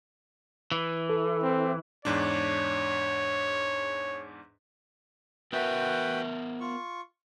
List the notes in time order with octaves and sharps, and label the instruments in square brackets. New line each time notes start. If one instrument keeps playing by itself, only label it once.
[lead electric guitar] E3
[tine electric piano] A4
[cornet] C4
[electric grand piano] E2 G#2 D4 [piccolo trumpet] C#5
[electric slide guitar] B3 A#4 E5 [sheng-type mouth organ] F#4 B4 G5
[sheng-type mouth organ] F4 C#6